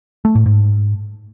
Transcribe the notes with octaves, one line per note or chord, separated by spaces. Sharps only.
A3
A2
G#2